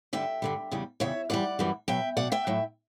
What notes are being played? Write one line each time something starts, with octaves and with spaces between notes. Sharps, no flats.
G2 D3 G3 E5 G5
G2 D3 G3
E2 C#3 G3
E2 C#3 G3 C#5 E5
F#2 E3 G3 D5 F#5
F#2 E3 G3
B2 F#3 E5 G5
B2 F#3 D5 F#5
E5 G5
A2 F#3